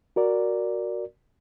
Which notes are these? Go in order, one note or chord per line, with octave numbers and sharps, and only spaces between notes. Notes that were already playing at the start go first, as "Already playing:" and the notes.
F#4 A#4 D5